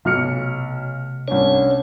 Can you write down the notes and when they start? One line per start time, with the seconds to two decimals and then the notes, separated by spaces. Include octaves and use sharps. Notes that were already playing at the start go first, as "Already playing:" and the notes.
0.05 B1 C3 A3 F6 C#7
1.28 C2 C#4 D4 C#5